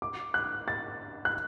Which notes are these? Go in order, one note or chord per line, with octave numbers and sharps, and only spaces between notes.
D6
F#6
A6
F#6